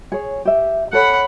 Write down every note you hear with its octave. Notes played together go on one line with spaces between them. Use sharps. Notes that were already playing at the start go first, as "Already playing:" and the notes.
G#4 C#5
G4 E5
A4 C#5 F#5 B5